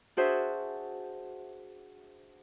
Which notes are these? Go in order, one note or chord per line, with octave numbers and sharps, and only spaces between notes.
D4 F#4 G#4 C5 E5 F#5